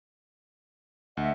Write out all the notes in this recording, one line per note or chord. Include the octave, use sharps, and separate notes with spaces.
D2 D#5 E5 F#5